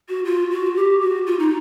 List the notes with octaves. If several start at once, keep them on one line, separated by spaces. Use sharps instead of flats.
F#4
F4
F#4
G4
F#4
F4
D#4